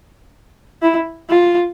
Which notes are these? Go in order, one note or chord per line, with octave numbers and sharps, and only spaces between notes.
E4
F4